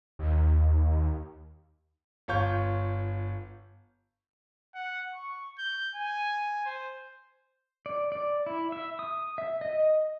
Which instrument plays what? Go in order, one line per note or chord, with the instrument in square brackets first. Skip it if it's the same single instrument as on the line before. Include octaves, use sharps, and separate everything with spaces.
[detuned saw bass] D#2
[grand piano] G1 F4 C#5 C#6 G6
[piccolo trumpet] F#5
C#6
G6
G#5
C5
[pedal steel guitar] D5
D5
E4
E5
D#6
E5
D#5